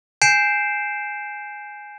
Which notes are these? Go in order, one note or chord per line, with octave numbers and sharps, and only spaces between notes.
G#5 G6 C7 D7 E7